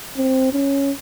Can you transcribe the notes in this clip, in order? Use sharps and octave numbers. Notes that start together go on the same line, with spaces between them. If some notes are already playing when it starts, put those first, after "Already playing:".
C4
C#4